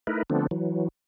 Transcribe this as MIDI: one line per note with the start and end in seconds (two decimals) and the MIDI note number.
0.07 0.23 57
0.07 0.23 63
0.07 0.23 64
0.07 0.23 70
0.07 0.23 71
0.30 0.47 50
0.30 0.47 53
0.30 0.47 57
0.30 0.47 59
0.30 0.47 60
0.30 0.47 62
0.51 0.88 52
0.51 0.88 54